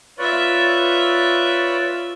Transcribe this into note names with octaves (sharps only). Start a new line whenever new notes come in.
F4 B4 C#5 D5 E5